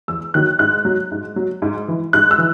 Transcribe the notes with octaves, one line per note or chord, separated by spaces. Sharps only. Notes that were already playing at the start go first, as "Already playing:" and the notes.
E2 E6
D#3 F#3 F#6
G#2 F#6
F#3
G#2
F#3
G#2
E3
G#2 F#6
E6
E3